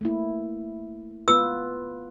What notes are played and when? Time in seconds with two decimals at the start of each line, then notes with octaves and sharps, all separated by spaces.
0.01 A3 A#3 E4
1.28 B3 F4 B4 E6